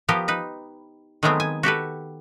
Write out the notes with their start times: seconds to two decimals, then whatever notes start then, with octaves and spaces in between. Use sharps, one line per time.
0.09 F3 B3 G4 A#4
0.28 D#4 B4
1.23 D#3 F#3 G#3 A3 B3 C4
1.40 G#5
1.63 F#4 G4 A4 B4